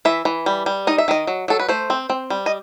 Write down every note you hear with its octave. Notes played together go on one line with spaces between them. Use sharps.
E3 E5
E3
G3
G3
D#4 D#5
E5
D#3 D#5
F#3
F#3 A4
B4
A3 C5
C4
C4
G3
D#5